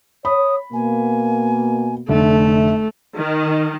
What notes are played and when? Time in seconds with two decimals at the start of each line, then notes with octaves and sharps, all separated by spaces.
0.25 C#5 B5 D#6
0.73 B2 A#3 G#5
2.09 F1 D3 A3 E5
3.17 D#3